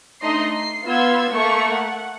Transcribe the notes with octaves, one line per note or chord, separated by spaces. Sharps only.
A3 D4 D#4 D#5 C6 C7
C7
B3 F4 C6 E6 G#6
A3 A#3 C#6
F#5